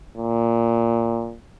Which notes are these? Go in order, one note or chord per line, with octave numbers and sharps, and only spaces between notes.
A#2